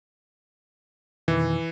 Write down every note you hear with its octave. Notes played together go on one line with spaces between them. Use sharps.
F2 B2 D#3 E3